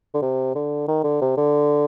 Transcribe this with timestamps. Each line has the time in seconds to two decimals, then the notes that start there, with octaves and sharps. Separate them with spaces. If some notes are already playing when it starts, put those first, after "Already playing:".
0.14 D3
0.22 C3
0.55 D3
0.88 D#3
1.04 D3
1.21 C3
1.37 D3